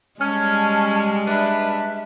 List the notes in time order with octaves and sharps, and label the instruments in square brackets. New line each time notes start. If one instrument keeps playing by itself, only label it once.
[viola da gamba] G3 G#3 [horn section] C#4 [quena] A5 [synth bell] F6
[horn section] D4 B4 [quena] E5